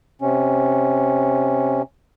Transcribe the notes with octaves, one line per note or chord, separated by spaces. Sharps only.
C3 C#4